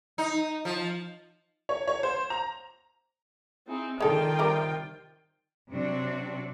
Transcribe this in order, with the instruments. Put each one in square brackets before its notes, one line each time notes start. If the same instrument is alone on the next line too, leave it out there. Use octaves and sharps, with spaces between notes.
[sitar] D#4
F3
[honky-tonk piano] C#5
C#5
C5
A#5
[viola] C4 D#4 [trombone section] E4 G#4
[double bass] D#3 [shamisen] G#3 A4 [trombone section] D4 D#4 [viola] F4 G5
[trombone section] C3 [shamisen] G3 A#4
[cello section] C3 F#3 C4 D4 F#4